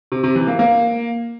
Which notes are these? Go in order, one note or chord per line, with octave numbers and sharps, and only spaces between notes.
C3
C3
E3
A#3
A#3